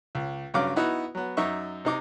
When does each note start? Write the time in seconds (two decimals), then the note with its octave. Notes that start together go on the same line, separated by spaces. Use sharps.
0.15 C#2
0.54 G2 C#3 F#3 F5 D6
0.76 B3 D#4 E4 F#4
1.15 F#3 B3
1.37 F#2 D#4 E5 C#6
1.85 C3 D#4 D6